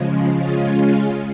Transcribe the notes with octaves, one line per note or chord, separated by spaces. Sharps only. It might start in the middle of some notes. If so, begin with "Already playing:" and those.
Already playing: C#3 F3 G#3
C#3 G#3 C#4 F4